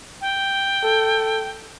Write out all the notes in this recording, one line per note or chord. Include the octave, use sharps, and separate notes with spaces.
G5
A4